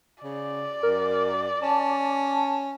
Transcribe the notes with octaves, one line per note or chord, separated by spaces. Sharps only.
C#3 D5
F#2 A#4
C#4 A5